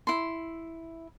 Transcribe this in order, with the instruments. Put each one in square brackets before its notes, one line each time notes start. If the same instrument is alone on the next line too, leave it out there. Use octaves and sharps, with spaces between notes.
[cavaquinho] E4 C6